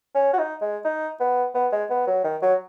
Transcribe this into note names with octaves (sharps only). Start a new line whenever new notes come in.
C#4
F#4
D#4
G#3
D#4
B3
B3
G#3
B3
F#3
D#3
F#3